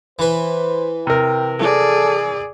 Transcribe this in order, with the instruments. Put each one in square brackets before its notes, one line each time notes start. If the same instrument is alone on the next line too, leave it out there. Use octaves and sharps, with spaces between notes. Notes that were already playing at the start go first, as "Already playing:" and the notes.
[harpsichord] E3 B4 [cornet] C5
[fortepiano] C3 A#4 [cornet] G5
[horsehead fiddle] G#4 D5 [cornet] A4